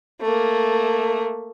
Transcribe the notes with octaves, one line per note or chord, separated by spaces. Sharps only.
A3 A#3